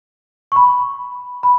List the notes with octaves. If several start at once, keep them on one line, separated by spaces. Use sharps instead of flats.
C#6
B5
B5